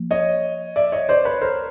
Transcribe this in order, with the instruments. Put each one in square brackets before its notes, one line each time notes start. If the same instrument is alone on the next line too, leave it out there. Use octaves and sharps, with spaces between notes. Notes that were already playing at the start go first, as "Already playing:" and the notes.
Already playing: [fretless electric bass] F3 A#3
[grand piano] C#5 D#5
D5 E5
C#5 D#5
C5 D5
B4 C#5
A#4 C5